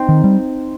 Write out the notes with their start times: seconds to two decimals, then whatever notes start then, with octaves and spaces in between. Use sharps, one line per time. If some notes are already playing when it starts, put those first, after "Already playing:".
Already playing: C4 D#4
0.09 D#3
0.24 G3